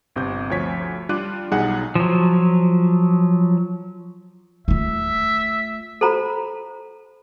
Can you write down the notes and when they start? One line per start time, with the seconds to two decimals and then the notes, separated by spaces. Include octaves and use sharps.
0.16 G1 C3 G6
0.50 D2 F3 C#5 B6
1.09 G3 D4 F4 D6 F#6 D#7
1.51 B1 G3 D#4 G#4 F#5 F#6
1.95 F3 F#3
4.68 A3 F4 E5
6.01 A4 C5 A#5 B5